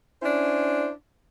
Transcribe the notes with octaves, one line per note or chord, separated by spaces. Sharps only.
C#4 D4 E4 C5